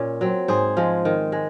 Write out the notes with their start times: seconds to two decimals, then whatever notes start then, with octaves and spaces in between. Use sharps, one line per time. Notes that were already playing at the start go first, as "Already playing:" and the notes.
Already playing: A#2 C#4
0.21 F#3 C4
0.48 G#2 G#4 C5
0.77 F3 G#3
1.05 D#3
1.32 G#3